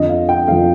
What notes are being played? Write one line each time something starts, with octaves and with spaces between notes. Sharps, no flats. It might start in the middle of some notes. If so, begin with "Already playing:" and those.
Already playing: F2 D3 F3 D#5
F5
G5
F2 D3 F3 F5